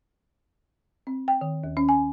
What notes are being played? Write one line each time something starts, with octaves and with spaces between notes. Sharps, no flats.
C4
G5
D#3
D#2
C#4
G#5